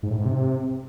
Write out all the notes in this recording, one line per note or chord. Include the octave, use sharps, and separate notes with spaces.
G#2
A2
G#2
C3